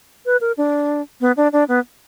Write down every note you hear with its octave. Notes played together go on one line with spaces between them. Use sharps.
B4
A#4
D4
B3
D4
D4
B3